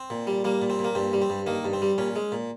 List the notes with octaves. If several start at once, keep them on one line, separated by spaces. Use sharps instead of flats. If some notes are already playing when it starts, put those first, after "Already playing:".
Already playing: C4
A#2
G3
G3 A#3
A#2
C4
A#2
A#3
G2 C4
G3
C4
G2
D#3 A#3
G2
C4
G3
A#2 C#4
G#3
A#2